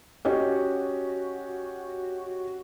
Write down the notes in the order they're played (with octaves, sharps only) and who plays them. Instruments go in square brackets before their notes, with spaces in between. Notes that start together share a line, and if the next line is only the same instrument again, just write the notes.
[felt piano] C#4 G4 D#5 [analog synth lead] F#4